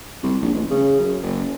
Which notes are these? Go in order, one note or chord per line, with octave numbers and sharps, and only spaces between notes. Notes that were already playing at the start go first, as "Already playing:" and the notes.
C2
A#1
A1
C#3
F#2
F#1